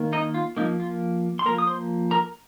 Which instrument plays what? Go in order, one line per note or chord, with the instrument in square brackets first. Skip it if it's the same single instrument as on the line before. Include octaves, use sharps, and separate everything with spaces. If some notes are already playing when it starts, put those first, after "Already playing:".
Already playing: [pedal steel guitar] D#3 A#3
D#4 D#5
F4
F3 A#3 D#4
F4
C6
F3 A#3 A#4 A#5
D#6
C5 C6
A#4 A#5